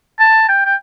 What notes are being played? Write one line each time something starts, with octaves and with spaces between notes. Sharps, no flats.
A5
G5
G5